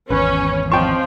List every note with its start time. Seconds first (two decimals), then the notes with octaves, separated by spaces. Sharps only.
0.10 G#1 E2 C#4 B4
0.72 F3 C4 C5 D#5 G5 A5 C#6